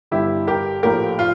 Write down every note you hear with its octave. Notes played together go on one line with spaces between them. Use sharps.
G1 G2 D3 E4 G4
G4 A#4
A#1 A2 F3 A3 G4 A#4
F4